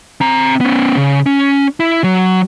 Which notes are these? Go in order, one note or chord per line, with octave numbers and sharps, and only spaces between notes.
C4 A#5
B3 C#4
C#3
C#4
E4
F#3